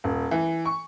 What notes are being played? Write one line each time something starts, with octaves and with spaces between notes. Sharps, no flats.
D#1
E3
C#6